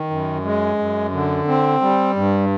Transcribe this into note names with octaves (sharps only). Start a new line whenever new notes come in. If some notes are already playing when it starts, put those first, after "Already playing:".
Already playing: D#3
F#2
G#3
F#2
D3
C4
G3
G2